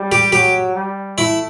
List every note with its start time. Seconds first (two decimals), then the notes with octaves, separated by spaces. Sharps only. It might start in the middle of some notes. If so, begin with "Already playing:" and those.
Already playing: G3
0.12 G4
0.32 F#3 G4
0.76 G3
1.18 A3 E4